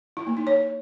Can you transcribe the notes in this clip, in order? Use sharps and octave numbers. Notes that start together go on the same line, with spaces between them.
E4
A#3
D#4
C#5